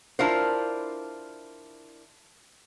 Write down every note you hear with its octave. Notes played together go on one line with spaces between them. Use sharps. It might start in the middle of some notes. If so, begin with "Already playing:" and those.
D4 E4 F4 A#4 C5